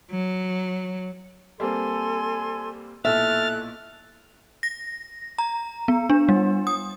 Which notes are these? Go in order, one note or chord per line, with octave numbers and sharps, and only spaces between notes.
F#3
G3 A#3 C4 A4 G#5 C6
B1 A#2 E4 A4 E5 F6 F#6 A6
A#6
A#5
B3
D4
G3
D#6